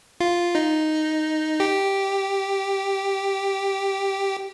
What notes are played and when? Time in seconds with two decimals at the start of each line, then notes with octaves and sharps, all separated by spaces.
0.20 F4
0.55 D#4
1.60 G4